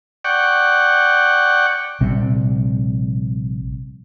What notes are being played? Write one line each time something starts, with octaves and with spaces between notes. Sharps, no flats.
D5 F#5 G5 C#6
A#1 C3 G3 C4